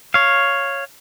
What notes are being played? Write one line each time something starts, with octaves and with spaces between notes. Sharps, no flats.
C#5 F5